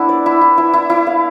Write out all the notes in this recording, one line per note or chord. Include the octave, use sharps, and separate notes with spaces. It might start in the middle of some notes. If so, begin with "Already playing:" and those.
Already playing: B3 D4 E4
D5
E4
E4
E4
E4
E4
F5